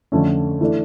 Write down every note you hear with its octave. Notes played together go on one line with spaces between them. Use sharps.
F2 D3 A3 C#4
E3 A3 D4